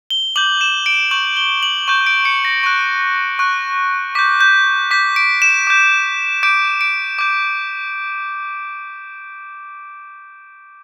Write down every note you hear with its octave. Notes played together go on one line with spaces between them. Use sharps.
G7
D6 G6 F#7
E7
D7
C#6 G6 F#7
G7
F#7
C#6 G6 E7
D7
C#7
A#6
C#6 F#6
C#6 F#6
D6 G6 B6
G6
D6 G6 B6
D7
E7
D6 G6
D6 G6 D7
D7
D6 G6